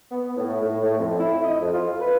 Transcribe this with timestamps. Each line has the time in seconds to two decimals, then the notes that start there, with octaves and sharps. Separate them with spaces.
0.11 B3
0.37 A2
0.63 A2
0.83 A2
0.98 F2
1.19 E4
1.44 D#5
1.61 F2
1.74 F4
2.00 B4